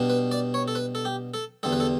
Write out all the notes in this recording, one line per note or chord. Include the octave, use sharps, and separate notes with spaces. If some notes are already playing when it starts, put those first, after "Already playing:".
Already playing: B2 G3 D4
B4
D5
C#5
A4
B4
A4
G4
A4
E2 D3 G3 A4
B4
A4